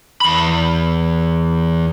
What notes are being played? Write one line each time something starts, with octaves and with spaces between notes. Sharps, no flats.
E2 B5